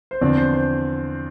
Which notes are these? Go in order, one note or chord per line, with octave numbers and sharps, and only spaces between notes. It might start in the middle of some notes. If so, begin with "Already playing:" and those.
C5
E2 D3 F3 C4 D5
C5
C5